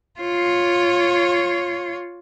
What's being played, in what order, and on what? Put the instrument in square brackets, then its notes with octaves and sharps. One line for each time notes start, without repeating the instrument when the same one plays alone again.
[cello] F4 C#5